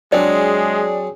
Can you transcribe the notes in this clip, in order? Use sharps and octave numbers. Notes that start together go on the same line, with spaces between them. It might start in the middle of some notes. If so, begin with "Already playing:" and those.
F#3 G#3 C4 D4 G#4